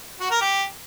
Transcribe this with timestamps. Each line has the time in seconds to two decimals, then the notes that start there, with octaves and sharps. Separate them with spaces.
0.20 F#4
0.31 A#4
0.41 G4